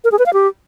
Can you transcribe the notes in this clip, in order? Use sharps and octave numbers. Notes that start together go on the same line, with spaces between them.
A#4
G#4
B4
F5
G4